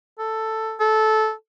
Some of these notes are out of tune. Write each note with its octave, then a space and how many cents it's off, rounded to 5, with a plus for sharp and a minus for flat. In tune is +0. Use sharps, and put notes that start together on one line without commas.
A4 +5
A4 -15